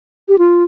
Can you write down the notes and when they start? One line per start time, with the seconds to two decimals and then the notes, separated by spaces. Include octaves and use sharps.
0.29 G4
0.38 F4